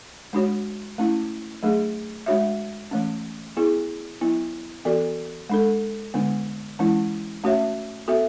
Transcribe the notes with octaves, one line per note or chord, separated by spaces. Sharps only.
G#3 D4 F#4 C#5
A3 C#4 E4
F#3 A3 D4 G#4
G#3 D4 F#4 C#5 E5
E3 A3 C#4
B3 E4 G#4
F#3 B3 E4
E3 B3 F#4 A4 D5
G#3 D4 A4
D3 G#3 B3 D4
E3 G#3 C#4 E4
A3 C#4 F#4 C#5 E5
B3 F#4 A4 E5